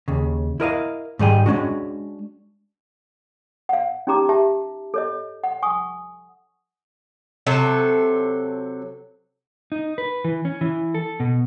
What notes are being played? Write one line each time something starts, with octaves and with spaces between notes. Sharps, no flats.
D#2 C#3
E4 A#4 D#5 F5
G#2 D#3 G3 G#4 G5
G#3 C#4 D4 F#4
F5 F#5
C#4 D#4 G4 A#5 D6
G4 E5 A5
A4 C#5 D#5
F#5
F#5 G#5 C#6 D#6
C3 F#3 A4
D#4
B4
E3
C#4
E3
A4
B2